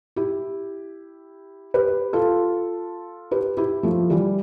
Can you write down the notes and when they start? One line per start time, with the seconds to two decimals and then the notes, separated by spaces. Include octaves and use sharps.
0.16 E4 G4
1.74 G4 B4
2.13 F4 A4
3.31 G4 B4
3.57 E4 G4
3.83 F3 A3
4.10 E3 G3